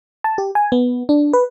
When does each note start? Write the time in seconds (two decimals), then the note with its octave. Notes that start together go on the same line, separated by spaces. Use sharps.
0.24 A5
0.38 G4
0.55 G#5
0.72 B3
1.09 D4
1.33 B4